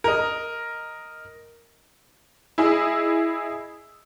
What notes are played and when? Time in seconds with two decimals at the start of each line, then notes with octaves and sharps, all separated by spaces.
0.04 A#4 D#5
2.58 E4 G#4 D#5 E6